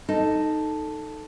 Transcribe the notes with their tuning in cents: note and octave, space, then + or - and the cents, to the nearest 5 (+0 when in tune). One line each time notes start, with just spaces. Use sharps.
D#4 -5 A4 +0